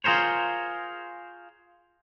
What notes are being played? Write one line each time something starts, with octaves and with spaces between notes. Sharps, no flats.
F4 G#4 A#4 C5 C#5